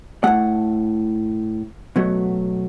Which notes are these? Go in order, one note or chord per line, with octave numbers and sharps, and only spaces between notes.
A2 A3 F#5
B2 F#3 A3